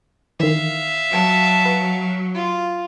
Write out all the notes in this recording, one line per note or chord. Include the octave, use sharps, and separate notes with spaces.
D#3 E3 E5 F5
F#3 A5
B4
F4